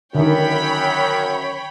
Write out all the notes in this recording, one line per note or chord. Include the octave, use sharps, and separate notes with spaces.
F#2 D3 D#3 C#5 G5 B5